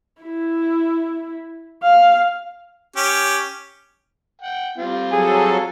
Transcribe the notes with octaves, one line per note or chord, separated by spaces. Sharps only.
E4
F5
C#4 G4
F#5 G5
G3 C4 F4
F#3 G#4 A4